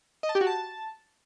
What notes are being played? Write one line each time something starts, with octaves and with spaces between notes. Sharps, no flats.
D#5
A5
G4
F#4
A5